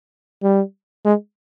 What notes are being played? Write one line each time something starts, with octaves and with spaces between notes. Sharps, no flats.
G3
G#3